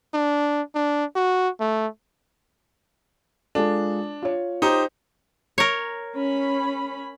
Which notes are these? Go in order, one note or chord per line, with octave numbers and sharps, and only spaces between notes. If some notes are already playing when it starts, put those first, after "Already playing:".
D4
D4
F#4
A3
G#3 D4 F4 A4
F4 C#5
D#4 G4 C5
A#4 C#5
C#4 B5